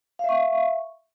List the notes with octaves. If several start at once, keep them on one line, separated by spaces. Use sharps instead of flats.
E5 F5 C#6